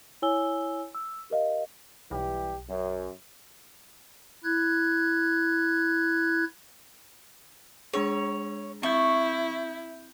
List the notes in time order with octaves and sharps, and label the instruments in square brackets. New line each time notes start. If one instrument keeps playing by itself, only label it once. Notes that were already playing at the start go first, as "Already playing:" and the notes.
[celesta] E4 C#5 G#5 E6 G7
E6
G4 A#4 D#5 F5
[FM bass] B1 [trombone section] E3 G3 G4
[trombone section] F#2
[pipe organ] E4 F#6 G#6
[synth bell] G#3 D4 G#4 [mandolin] C#5
[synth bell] C4 E5 G6 [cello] E4 [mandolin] C#6